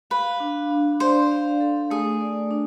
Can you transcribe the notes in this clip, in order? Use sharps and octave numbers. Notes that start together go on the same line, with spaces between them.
B4 F5
D4
D4
C5 D5
F5
A4
A3 G#4
D5
D4